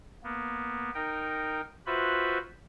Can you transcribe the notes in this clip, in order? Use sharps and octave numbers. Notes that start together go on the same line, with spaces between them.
A#3 B3
D#4 A#4 G5
F4 F#4 B4 C5 E5 B5